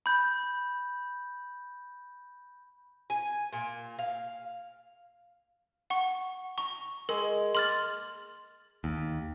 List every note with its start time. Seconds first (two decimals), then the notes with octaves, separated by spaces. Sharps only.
0.06 B5 G6
3.10 G#5
3.53 A#2
3.99 F5
5.90 F#5 C#6
6.58 A#5 C#6
7.09 G#3 A#4
7.55 A#3 C6 F6 A6
8.84 D#2